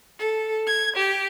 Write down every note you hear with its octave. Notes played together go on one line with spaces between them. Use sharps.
A4
G#6
G4